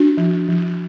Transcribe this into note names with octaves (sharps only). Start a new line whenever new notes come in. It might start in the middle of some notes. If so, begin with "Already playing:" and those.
Already playing: D4 F#4
F3
F3